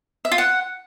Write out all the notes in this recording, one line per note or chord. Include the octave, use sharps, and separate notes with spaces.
E5
F4
F#5